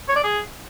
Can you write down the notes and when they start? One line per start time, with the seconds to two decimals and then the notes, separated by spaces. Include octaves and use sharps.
0.08 C#5
0.16 D5
0.24 G#4